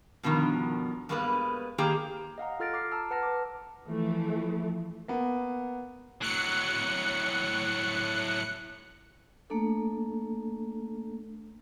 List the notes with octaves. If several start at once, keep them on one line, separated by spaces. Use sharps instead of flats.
G2 B2 D3 D#3 F3
G2 G3 G#3 A#3 B3 B4
D#3 A#3 G4 G#4 A#5
D#5 F5 F#5 A#5
F4 A4 F6 A6 A#6 D7
D6 F6 C7
A5 A#5 E6 F6
B4 F#5 A5 F6 A#6
B4 D6
E3 F3 A3
A#3 B3
A2 F#3 F#6 C#7
A3 A#3 D4 A4